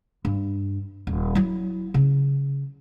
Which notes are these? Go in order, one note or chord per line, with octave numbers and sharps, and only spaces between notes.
G2
D#1
F#3 E4
C#3